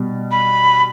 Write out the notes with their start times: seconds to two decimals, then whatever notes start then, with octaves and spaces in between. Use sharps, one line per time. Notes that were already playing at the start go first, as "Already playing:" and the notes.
Already playing: B2 G3
0.31 B5